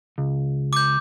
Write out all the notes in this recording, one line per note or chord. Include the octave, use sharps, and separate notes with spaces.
C#2
D6 G6